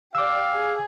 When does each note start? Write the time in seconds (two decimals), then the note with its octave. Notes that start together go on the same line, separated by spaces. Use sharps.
0.15 G4 D5 F5 D6 E6
0.54 G#4